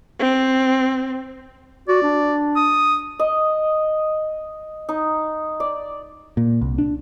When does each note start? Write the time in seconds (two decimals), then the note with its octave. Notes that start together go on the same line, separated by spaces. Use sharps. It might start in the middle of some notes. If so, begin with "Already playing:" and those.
0.20 C4
1.88 F#4 D5
2.03 D4
2.56 D#6
3.19 D#5
4.89 D#4
5.60 D5
6.37 A#2
6.61 C2
6.78 D4